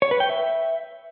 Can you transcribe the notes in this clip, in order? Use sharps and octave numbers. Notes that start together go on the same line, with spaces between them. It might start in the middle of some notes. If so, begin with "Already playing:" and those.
C#5
B4
G5
E5